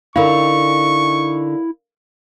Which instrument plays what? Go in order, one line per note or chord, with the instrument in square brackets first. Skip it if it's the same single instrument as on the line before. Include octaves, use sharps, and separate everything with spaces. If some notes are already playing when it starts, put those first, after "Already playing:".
[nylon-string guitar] D3 D#4 [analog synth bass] E4 [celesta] A#4 F5 [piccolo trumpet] C#6